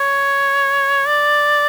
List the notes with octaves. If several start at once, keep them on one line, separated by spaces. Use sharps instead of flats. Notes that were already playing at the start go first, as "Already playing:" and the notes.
Already playing: C#5
D5